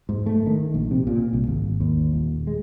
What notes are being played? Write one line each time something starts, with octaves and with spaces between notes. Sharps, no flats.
G#2
A3
D#3
A#1
C3
A#2
C2
G#1
D#2
D#1
G#3